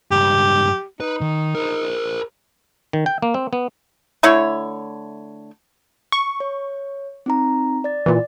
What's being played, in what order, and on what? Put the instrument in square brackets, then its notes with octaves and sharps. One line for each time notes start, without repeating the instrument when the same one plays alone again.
[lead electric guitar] C#2 G2 [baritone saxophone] G4
[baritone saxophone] D#4 [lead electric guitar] B4
[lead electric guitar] D#3
A#4 C5
[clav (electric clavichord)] D#3
G5
A#3
C4
B3
[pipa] D3 A3 E4 C#5
[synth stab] C#6
[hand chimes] C#5
C4 D#4 A#5
D5 A6
[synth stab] A#2 E3 [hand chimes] D5